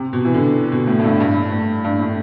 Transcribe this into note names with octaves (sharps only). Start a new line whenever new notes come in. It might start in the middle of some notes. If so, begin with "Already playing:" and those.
Already playing: C3
B2
E3
D3
B2
A2
A2
G2
G2
A2
G2
A2